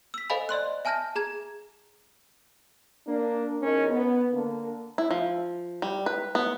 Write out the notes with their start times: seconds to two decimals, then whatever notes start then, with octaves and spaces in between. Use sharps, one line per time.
0.14 E6 B6
0.30 A4 C5 D#5 F5 G#5 B5
0.49 D5 D#5 C6 F#6
0.85 E5 G#5 A5 F6 G6 A#6
1.16 G#4 A#5 G#6
3.07 A#3 D4
3.61 E2 C#4 D#4 A#4
3.90 B3
4.33 D3 A#3
4.98 E4
5.11 F3
5.82 G3
6.06 B4
6.35 B3